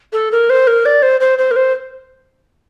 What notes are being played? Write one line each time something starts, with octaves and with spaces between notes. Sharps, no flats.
A4
A#4
C5
A#4
D5
C5
C5
C5
A#4
C5